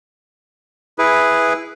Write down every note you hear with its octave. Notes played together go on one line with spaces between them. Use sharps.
E4 G#4 B4